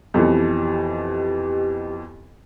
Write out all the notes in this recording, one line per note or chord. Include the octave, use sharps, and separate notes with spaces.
F2 B2 E3 G4